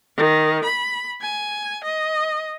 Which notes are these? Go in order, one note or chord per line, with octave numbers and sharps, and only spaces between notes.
D#3
B5
G#5
D#5